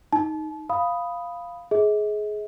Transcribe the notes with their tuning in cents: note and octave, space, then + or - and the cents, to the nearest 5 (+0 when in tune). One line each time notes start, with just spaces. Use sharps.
D#4 +0 A5 -35
F5 +0 B5 +0 D#6 +0
G#4 +20 D#5 +45